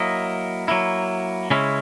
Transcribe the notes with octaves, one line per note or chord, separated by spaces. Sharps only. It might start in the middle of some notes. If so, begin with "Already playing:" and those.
Already playing: F#3 A#3 E4 D#5
F#3 A#3 E4
C#3 G#3 C#4 E4